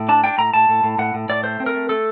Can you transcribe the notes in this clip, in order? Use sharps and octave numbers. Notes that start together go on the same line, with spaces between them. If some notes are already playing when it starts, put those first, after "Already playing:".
Already playing: A2
D4 A5
D4 G5
A2 A#5
A2 A5
A2
A2
A2 F#5
A2
A2 D5
A3 C5
C4
A#4
A3
A3 A4